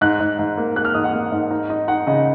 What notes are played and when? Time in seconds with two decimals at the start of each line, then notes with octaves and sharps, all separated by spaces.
0.01 G#2 F#6
0.20 G#2
0.39 G#2
0.57 A#3
0.76 A#3 F#6
0.85 F6
0.94 G#2 D#6
1.04 F#5
1.13 A#3
1.32 G#2
1.51 D#4
1.70 D#4
1.88 D#4 F#5
2.07 C#3 D#5